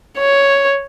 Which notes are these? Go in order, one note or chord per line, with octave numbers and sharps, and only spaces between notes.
C#5